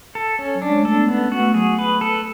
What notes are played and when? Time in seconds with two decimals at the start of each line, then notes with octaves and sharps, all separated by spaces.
0.15 A4
0.39 C#4
0.55 F#3
0.62 D4
0.69 G#3
0.82 A3 A4
0.95 B3
1.08 B3 C#4
1.24 C#4
1.32 F#4
1.40 A3
1.54 F#3 G#4
1.79 B4
2.01 A4